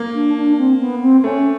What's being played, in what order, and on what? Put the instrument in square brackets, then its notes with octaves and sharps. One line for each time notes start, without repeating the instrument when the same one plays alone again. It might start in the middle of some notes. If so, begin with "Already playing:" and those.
Already playing: [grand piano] A#3
[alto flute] D4
D4
C4
B3
C4
[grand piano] A3 [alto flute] C#4